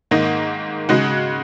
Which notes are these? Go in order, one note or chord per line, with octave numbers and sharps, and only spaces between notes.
G#2 D#3 A#3 D#4
C#3 G#3 D#4 F#4